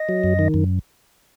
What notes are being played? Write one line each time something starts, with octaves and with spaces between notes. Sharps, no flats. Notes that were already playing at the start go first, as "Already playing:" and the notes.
Already playing: D#5
F#3
F#2
D#3
F#2